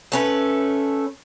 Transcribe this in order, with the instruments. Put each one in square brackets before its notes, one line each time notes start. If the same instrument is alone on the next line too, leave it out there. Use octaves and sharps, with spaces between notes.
[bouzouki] A3 C#4 B4